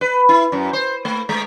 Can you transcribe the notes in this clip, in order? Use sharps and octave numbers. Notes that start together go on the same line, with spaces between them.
B4
E4
F#2
C5
A3
G#3